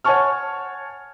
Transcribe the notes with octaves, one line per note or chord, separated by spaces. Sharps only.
C#5 F#5 G#5 A5 C#6 F6